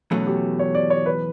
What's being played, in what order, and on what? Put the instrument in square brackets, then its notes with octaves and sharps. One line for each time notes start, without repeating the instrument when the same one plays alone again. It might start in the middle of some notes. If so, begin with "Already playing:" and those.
[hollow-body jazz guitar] E2 B2 F#3 A3 C#4
[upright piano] G4
C#5
D5
C#5
B4